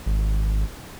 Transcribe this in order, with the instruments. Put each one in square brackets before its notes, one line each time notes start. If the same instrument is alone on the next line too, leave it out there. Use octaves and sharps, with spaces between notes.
[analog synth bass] G#1